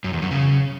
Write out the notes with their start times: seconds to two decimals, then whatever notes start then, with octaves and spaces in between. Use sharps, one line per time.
0.04 F#2
0.13 E2
0.22 F#2
0.31 C#3